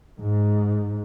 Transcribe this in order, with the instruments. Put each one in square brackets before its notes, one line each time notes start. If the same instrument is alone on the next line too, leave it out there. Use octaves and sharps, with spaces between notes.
[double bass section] G#2